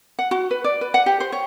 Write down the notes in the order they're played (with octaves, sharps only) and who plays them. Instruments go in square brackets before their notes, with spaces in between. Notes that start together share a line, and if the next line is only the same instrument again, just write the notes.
[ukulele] F#5
F#4
B4
D5
B4
F#5
G4
C5
C#5